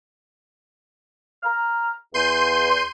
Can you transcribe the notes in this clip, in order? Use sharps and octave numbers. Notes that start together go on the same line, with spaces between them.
A#5 F6
E2 C6 G6 D#7